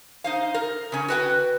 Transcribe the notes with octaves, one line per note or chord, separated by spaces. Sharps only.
D#4 C5 F5
A#4
C#3 C#4
F#4 B4 G5